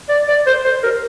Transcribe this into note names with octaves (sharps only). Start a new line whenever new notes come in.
D5
D5
C5
C5
A#4